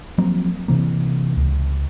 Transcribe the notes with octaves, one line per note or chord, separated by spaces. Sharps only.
F3 F#3 A#3 C4
C3 E3 A#3
C#2